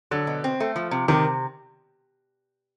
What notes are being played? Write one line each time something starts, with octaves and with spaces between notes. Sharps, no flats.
D3 F#3
B2
C4
A3
F3
C3
C3 D#3